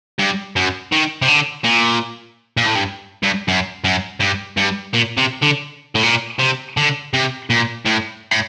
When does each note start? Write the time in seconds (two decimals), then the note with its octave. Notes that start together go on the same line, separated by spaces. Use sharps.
0.19 G2
0.56 F#2
0.92 D#3
1.22 C3
1.28 D3
1.64 A#2
2.57 A#2
2.66 A2
2.75 G2
3.23 G2
3.48 F#2
3.84 F#2
4.20 G2
4.57 G2
4.94 A#2
5.18 C3
5.42 D3
5.95 A2
6.03 A#2
6.39 C3
6.77 D3
7.13 C3
7.50 A#2
7.86 A2
8.31 A2